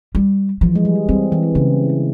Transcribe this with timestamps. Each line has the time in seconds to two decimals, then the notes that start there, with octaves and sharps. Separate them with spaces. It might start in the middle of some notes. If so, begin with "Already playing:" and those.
0.15 G3
0.61 E3 F3
0.76 G#3
0.85 G3
1.09 G3 C4
1.32 E3
1.55 C#3 A#3